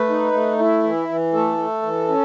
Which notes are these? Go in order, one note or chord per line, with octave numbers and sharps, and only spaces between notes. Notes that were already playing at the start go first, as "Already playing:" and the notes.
Already playing: A3 B4
D#4
A3
E4
E3
E3
A3 A4
A3
E3
C#4